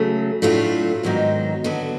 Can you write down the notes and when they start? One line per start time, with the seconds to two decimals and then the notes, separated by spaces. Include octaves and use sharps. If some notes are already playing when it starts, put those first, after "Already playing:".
Already playing: C#3 F#3 A3
0.42 A2 F#3 A3 D4 F4
1.03 G#2 D#3 F#3 B3 D#4
1.64 D3 F#3 B3